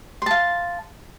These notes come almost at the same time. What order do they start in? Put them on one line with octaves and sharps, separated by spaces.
C6 A5 F5